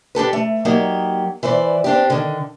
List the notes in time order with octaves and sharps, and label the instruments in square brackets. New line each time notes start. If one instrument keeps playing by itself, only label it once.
[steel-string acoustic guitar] D4 G4 A4 B4
A3
F#3 A#3 D#4 G4 D5
E3 B4 C5 D5
C4 D4 G4
D3 D#3